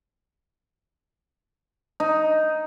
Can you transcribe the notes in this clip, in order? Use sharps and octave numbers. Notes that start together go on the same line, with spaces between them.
D#4